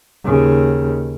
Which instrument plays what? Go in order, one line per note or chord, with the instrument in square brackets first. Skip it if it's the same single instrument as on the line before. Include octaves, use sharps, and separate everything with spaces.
[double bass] D#2 C#3